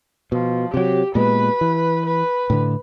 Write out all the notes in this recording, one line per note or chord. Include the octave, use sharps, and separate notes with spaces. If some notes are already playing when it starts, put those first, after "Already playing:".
B2 F3
C3 F#3 G4
A#2 G#3 B3 B4
E3
B4
A2 D3